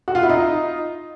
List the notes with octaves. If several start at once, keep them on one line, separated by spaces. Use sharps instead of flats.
F#4
F4
E4
D#4 F4